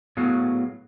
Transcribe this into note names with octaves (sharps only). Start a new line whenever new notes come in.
A2 F#3 B3 G#4 F5